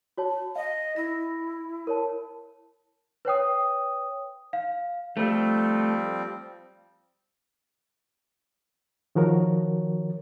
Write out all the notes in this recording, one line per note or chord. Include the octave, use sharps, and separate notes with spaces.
F#4 C#5 A5
D#5 F5
E4 A#6
A#4 C#5 A5
B4 C#5 G5 D#6
F5
F3 G3 A3 C4
D#3 F3 F#4 A#4 C#5